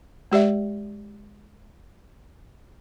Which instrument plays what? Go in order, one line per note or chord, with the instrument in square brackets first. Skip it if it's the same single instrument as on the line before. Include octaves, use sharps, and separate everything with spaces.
[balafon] G#3 G4 D5 E5